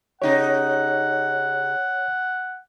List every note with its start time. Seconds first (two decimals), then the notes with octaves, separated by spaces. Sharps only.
0.22 C#3 D#4 G4 C#5 F#5